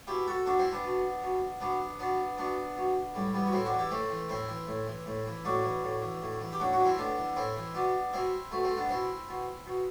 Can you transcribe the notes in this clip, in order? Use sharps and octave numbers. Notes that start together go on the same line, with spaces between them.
B2 E4 G4
F#4 A4
B2 D4 F#4
C4 E4
B3 D4
B2
B2
B2 B3 D4
B2 B3 D4
B2 B3 D4
B2
A2 G3
E3 G3 B3
F#4
A2 C4 E4
D4 F#4
E3
E4 G4
A2 A3 C4
E3
A2 C4 E4
E3
A2
E3
A2
E3
A2 D4 F#4
E3
A2
E3
A2
E3
G4
A2 D4 F#4
D4 F#4
E3
C4 E4
A2 B3 D4
E3
A2 C4 E4
E3
B2 B3 D4
B2 C4 E4
B2 A3
A3 C4
B3 D4
B2 C4 E4
B2
B2